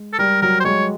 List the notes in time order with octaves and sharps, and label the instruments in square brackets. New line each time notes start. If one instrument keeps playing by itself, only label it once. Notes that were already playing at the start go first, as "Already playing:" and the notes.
Already playing: [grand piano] G#3
[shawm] A4
[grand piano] G3 [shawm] A#4
[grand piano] F#3 [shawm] A#4
[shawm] C5
[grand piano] G#3 [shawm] C#5